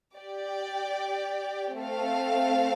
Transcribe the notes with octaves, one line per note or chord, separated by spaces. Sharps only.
G4 D5 G5
A3 C4 A4 F5